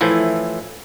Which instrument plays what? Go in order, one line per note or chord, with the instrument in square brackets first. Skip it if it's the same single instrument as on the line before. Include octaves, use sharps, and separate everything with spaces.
[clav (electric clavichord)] A2 E3 F3 E4